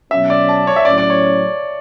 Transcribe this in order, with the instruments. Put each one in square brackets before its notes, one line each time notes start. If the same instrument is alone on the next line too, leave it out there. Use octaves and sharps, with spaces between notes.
[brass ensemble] B2 F#3 C#4 [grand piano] E5
[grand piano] D5
A5
C#5
E5
[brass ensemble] A2 F#3 C#4 [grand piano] D5
[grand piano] D5
C#5